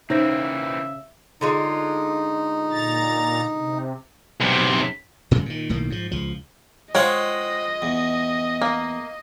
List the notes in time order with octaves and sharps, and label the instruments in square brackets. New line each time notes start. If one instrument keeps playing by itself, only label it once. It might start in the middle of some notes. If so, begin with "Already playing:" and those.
[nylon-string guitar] C#3 [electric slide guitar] E3 A#3 C4 [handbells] D#4 C5 A#6 [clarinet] E5
[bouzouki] D3 G#3 F4 [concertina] D#4
[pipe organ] A#2 A#5 A6
C3
[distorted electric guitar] B1 C3
[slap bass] A2 C#3 F#3 G3
A#2 D#3
B1 A2 D#3 A#3
G#2 F3
C#2 F3
[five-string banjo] G#3 F4 C#5 [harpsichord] C5 F#5 G5 [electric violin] D#5
[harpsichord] E2
[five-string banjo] A#3